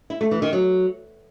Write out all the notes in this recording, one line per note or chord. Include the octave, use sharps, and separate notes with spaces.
E4
A3
E3
D#3
F#3